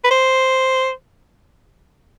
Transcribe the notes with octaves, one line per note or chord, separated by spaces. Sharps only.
B4
C5